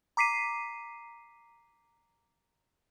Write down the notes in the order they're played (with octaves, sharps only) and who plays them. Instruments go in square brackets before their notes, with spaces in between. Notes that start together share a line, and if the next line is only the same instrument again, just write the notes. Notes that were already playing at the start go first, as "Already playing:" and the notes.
[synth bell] A#5 D6 B6 C7 D#7